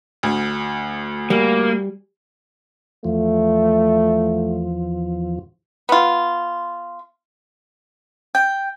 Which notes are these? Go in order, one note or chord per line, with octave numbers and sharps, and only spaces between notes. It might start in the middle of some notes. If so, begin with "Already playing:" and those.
D2
G3 A#3
E2 F3 A3
B3 F4
G5